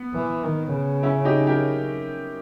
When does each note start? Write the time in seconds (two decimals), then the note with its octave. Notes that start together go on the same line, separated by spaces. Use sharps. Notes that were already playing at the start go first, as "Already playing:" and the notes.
Already playing: B3
0.14 E3
0.43 D#3
0.73 C#3
1.03 C#4 E4
1.25 D#4 G4
1.47 G4 A#4